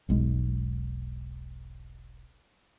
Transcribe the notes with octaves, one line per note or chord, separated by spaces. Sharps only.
E1 B1 G#3